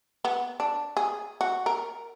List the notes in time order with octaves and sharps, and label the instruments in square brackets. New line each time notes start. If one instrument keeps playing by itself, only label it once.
[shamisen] B3
D4
G#4
F#4
A#4